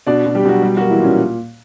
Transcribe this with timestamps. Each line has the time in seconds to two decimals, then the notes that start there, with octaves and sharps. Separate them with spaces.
0.07 B2 D4 D5
0.26 B2
0.35 G3 G4
0.45 B2 F#3 F#4
0.62 G3 G4
0.77 F#3 A#3 F#4
0.90 E3 E4
1.00 A#2 C#4